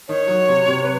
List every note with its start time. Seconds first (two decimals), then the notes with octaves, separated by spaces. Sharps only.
0.08 D#3 C#5
0.28 F#3
0.49 C3
0.68 C3
0.83 B4